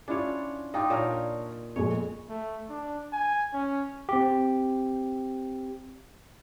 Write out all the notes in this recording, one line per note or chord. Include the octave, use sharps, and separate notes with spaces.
C#4 D4 E4 F4 C#5
D#4 F4 F5 G5 D6
A#2 D4 A#4 C#5 F5
F2 A#2 G#3 C#5
A3
D4
G#5
C#4
C4 G4